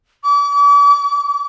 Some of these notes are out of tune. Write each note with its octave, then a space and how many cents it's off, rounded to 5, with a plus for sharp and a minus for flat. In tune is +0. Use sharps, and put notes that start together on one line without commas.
D6 -40